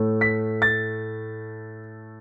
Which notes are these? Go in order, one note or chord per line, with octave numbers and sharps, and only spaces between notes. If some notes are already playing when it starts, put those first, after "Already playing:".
Already playing: A2 A3
B6
A6